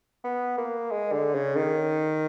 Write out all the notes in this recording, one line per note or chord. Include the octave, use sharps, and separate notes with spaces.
B3
A#3
G#3
D3
C#3
D#3